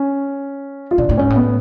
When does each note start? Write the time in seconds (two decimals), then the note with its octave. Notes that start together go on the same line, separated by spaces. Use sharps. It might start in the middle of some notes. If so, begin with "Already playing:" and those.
Already playing: C#4
0.91 F4
0.98 B2 D4
1.09 A2
1.18 G#2 C#4
1.30 A2
1.36 B3